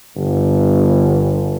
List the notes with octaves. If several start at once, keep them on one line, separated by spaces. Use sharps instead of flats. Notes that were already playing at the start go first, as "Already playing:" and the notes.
G1